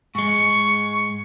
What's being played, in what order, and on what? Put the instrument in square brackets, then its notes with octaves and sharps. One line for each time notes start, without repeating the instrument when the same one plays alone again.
[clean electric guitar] G#2 G#3 [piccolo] C#6